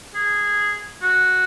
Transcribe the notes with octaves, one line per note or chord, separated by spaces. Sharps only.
G#4
F#4